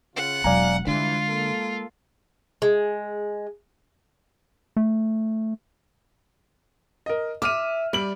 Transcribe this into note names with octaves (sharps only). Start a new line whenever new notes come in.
C#3 F4 F#5
E1 F#3 D5 F5 G#5 A#5
G2 D3 E3 G#3 D4 F4
A#3 A4
G#3
A3
A#4 D#5
E5 D6 F6 D#7
G3 D5 F#7